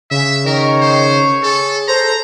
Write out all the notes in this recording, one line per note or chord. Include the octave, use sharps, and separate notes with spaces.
C#3 E5
D#3 A#4 C#5
C5
G#4 A4
A4 C5 A#5